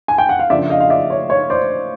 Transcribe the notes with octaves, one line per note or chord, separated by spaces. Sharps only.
G#5
G5
F#5
F5
C#3 F3 A#3 D4 D5 E5
D#5 F5
F5
D5 E5
C#5
C#5
C5 D5